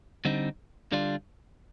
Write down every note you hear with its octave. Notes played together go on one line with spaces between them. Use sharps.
D3 G3 C4 D#4
D3 G3 D4 F4